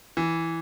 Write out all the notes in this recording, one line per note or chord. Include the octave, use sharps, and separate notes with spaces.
E3